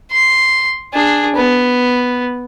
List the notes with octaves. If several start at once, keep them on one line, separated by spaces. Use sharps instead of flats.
C6
D4 G#4
B3